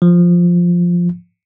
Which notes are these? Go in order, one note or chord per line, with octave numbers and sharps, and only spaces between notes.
F3